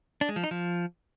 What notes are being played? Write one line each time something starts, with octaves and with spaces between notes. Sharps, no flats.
D4
G#3
F3
D#4
F3